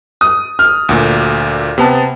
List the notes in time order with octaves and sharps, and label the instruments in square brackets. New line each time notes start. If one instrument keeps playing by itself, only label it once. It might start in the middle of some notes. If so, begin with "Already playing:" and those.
[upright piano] D#6
F6
[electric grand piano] D2 A#2
C3 B3 A5